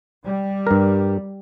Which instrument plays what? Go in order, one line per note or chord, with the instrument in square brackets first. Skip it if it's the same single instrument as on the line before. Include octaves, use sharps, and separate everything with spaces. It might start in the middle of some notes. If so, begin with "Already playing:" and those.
[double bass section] G3
[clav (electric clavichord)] G2 A#4